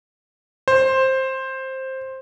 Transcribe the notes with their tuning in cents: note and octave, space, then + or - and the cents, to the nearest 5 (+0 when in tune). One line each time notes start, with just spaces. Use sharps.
C5 +10